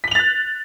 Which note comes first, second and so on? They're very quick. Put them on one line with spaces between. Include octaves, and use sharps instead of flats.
B6 F#7 F7 A6 F#6